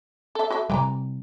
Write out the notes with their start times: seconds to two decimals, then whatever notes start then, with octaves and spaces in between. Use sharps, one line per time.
0.35 A4 E5
0.50 F#4 A4 E5
0.70 C3 E3 G3 G5 A#5